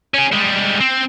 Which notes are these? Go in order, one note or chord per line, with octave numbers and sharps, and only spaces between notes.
C#4 G#4
G3 G#3
C4